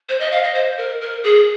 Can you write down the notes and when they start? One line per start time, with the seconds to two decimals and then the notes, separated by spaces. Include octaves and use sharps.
0.09 C5
0.20 D#5
0.32 F5
0.43 D#5
0.55 C5
0.78 A#4
1.01 A#4
1.24 G#4